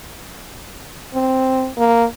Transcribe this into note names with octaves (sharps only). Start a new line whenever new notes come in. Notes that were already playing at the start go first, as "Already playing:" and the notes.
C4
A#3